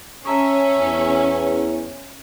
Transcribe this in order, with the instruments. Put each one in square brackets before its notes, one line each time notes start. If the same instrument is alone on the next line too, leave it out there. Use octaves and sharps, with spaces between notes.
[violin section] C#4 [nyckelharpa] E5 [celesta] A5 A#5 C#6
[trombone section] E2